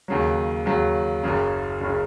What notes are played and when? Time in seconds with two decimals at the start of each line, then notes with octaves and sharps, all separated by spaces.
0.08 D#2 C#3 F#3
0.66 D#2 C#3 F#3
1.23 F#1 F#2 C#3
1.80 F#1 C#3